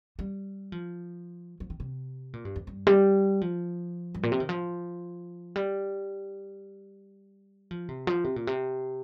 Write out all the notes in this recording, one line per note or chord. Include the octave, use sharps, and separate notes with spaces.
G3
F3
F3
D#3
C3
A#2
G2
F2
G2
G3
F3
G2
A#2
C3
D#3
F3
G3
F3
C3
F3
C3
A#2
C3